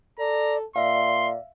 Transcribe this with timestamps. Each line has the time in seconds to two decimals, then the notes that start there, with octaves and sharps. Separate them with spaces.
0.19 A4 D5 A#5
0.76 A#2 D5 E5 F5 C6